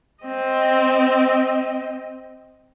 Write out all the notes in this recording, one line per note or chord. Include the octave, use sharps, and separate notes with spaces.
C4 D#5